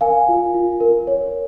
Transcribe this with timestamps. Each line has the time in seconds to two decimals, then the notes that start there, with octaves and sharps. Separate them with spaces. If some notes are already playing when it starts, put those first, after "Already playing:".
0.01 A#4 F5 G#5
0.28 F4
0.54 F4
0.80 A#4
1.07 C#5